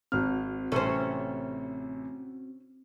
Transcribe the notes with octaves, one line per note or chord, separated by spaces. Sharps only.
G#1 C4 F#4 F6
A1 C3 C#4 A4 C5